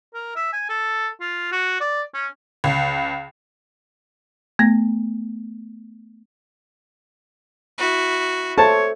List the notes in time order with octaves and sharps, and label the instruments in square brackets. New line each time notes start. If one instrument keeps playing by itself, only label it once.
[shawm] A#4
E5
G#5
A4
F4
F#4
D5
C#4
[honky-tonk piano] C#2
[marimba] A3 B3 A#6
[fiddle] E4 F#4
[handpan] A4 C5 E5 [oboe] C#5 [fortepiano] A5